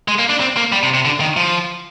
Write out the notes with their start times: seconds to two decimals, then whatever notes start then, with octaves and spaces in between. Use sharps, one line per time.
0.08 G#3
0.19 A#3
0.30 D4
0.40 C4
0.57 A#3
0.72 G3
0.83 C3
0.94 C3
1.05 D3
1.20 D#3
1.37 F3